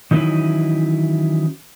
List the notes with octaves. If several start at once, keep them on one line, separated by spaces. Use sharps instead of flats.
D#3 E3 F#3 C#4 D#4 E4